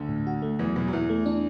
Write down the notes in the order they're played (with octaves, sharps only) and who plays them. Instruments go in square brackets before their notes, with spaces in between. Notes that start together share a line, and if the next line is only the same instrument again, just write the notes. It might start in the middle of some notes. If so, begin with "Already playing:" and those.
Already playing: [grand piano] D2 D3
[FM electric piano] A2
F#4
A3
[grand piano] E2 E3 [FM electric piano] F#3
[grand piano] E2 E3 [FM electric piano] B2
[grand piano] F#3
[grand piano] E2 E3 [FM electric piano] E4
[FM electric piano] A3
D4